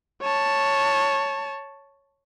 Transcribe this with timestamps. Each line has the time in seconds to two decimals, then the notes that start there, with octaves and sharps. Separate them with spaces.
0.22 C#5 A5